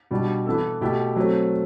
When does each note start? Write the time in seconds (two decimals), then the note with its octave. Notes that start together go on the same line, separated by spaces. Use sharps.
0.11 B2 G3 D4 G4
0.46 E3 B3 E4 A4
0.81 B2 A3 E4 G4
1.16 F#3 A3 C4